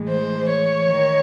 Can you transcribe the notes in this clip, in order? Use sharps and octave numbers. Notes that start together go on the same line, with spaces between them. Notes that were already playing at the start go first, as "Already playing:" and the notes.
Already playing: A2 E3 G#3
C5
C#5
D#3